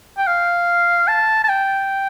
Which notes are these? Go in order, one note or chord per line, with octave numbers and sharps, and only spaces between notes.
G5
F5
A5
A5
G5